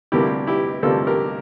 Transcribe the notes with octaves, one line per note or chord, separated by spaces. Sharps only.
D2 C3 G3 A#3 E4 G4
E4 G4
D2 C3 G3 A#3 F4 A4
G4 A#4